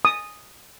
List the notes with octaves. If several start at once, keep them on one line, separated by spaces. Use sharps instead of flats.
D#6